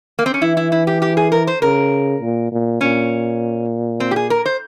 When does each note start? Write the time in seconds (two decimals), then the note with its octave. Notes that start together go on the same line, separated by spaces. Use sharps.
0.19 A#3
0.26 C4
0.34 C#4
0.42 E3 E4
0.57 E4
0.72 E4
0.87 G4
1.02 G4
1.17 G#4
1.32 A#4
1.47 C5
1.62 C#3 A#4
2.21 A#2
2.52 A#2
2.81 A#2 C#4
4.00 C4
4.11 G4
4.16 G#4
4.30 A#4
4.46 C5